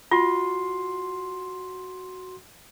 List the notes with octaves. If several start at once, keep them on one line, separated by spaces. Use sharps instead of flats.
F4 F#4 C6